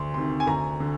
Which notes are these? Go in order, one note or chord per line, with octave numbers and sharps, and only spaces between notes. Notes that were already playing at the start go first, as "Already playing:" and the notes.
Already playing: D2 C6
C3 D#3 C6
G#5
D2 A#5
D3